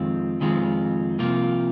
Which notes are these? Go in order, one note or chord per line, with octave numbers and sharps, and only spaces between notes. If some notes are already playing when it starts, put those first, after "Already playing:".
Already playing: F2 D#3 G#3 C4 F4
F2 D#3 G#3 C4 F4
C2 C3 F3 A#3 F4